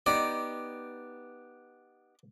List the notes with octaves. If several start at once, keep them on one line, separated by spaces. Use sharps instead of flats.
B3 D#4 G4 D5